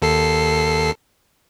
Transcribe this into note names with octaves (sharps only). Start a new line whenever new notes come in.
D#2 A4 C7